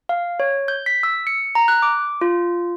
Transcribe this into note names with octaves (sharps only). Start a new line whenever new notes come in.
F5
C#5
G6
B6
E6
C#7
A#5
F#6
D6
F4